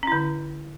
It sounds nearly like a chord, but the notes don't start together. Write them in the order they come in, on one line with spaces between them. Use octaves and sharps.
C#4 E4 D3